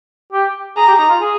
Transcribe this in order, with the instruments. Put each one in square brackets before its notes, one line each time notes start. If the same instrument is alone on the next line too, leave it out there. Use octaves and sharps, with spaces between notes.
[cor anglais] G4
[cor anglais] G#4 [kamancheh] A#5
[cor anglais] G4
D#4
F4
G#4